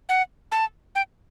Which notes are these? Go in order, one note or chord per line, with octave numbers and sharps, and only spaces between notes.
F#5
A5
G5